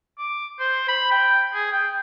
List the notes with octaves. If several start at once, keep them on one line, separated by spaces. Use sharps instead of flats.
D6
C5
B5
G5
G#4
G5